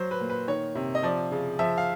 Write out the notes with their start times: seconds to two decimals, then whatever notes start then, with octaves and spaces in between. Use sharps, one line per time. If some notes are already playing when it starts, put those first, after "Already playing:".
Already playing: F#3 C5
0.11 B4
0.20 A#2
0.30 B4
0.48 D#3 C#5
0.75 C3
0.95 D#5
1.03 F3 D5
1.32 C#3
1.59 F3 E5
1.78 F5